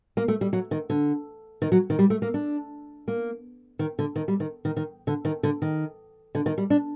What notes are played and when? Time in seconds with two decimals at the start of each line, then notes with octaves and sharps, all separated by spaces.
0.17 A#3
0.28 A3
0.41 G3
0.53 F#3
0.71 D#3
0.90 D3
1.62 D#3
1.72 F#3
1.90 D#3
1.99 G3
2.10 A3
2.22 A#3
2.34 D4
3.08 A#3
3.79 D#3
3.99 D3
4.16 D#3
4.28 G3
4.40 D#3
4.65 D#3
4.77 D#3
5.07 D3
5.25 D#3
5.43 D3
5.62 D#3
6.35 D3
6.46 D#3
6.58 G3
6.70 D4